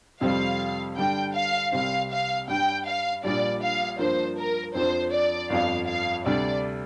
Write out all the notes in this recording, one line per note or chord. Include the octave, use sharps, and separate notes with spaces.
F2 C3 G3 C4 F5
G2 D3 G3 D4 G5
F5
C2 C3 G3 C4 F5
F5
G2 G3 D4 G5
F5
A#1 A#2 G3 D4 D5
F5
G2 F3 A#3 D4 C5
A#4
F2 F3 D4 C5
D5
G1 F2 F3 F5
F5
D2 C3 G3 D4 D5